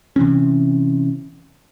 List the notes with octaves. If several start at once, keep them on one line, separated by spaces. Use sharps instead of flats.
C3 E3 C4 C#4